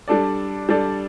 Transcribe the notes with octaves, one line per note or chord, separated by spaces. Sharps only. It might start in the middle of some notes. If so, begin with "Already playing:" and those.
G3 D4 A4 D5
G3 D4 A4 D5